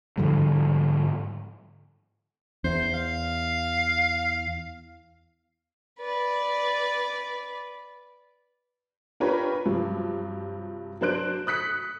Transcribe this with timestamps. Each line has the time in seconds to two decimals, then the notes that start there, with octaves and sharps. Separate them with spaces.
0.18 G#2 D3 F3 G3
2.64 E2 C5
2.94 F5
5.99 B4 D5
9.20 D4 F4 G4 A#4 B4 C#5
9.66 G2 C3 F3 F#3
11.01 F#3 D4 C5 F#6 D7
11.47 D#6 F#6 B6 C#7